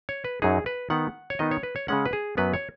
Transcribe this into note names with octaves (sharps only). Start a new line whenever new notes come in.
C#5
B4
F#2 F#3 D#4 G#4
B4
D#3 B3 D#4 F#5
C#5
D#3 B3 D#4 D#5
C#5
B4
C#5
C#3 G#3 C#4 F#5
B4
G#4
F#2 F#3 B3 B4
C#5